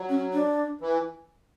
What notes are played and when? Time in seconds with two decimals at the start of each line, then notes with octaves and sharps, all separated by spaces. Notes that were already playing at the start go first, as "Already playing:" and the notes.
Already playing: F#3
0.09 C#4
0.33 D4
0.81 E3